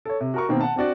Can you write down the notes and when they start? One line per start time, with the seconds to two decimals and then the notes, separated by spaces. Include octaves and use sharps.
0.05 A4 C#5
0.21 C3
0.34 F#4 A#4 C#6
0.49 B2 D#3 A#3 C4
0.61 F#5 A5
0.76 C4 D4 F#4 D5